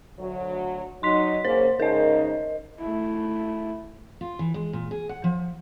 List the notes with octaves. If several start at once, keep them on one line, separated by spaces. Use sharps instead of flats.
D2 F#3
F#3 D#4 C6 B6
C#3 A#3 C#4 C5
G#2 C#3 D#4 A#4 D#5
A3 E4
F4
E3
G#3
A#2
G#4
F#5
F3